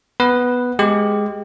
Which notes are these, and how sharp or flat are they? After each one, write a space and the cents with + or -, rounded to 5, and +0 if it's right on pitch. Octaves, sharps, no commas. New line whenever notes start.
B3 +0 B4 +0
G#3 +0 G4 +0